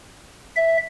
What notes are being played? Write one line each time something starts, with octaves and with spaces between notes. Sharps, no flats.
E5